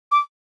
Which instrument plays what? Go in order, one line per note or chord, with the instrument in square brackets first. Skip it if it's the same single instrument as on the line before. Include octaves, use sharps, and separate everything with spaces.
[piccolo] D6